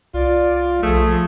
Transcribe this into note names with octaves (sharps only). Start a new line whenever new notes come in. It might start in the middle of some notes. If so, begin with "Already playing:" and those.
C2 F4 D5
B1 F3 A3 G#4 A5 D#6